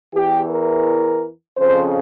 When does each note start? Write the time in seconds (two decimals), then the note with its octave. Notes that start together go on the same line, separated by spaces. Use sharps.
0.14 E2 E3 G4
0.50 A#4
1.58 F2 C#3 F3 C5